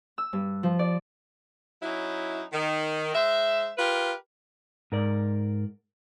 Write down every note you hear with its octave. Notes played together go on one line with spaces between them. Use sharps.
E6
G2
F3
D5
F#3 C#4 D#4 E4
D#3
G#3 C5 E5
F4 G4 A#4 B4
G#2 A#4 D5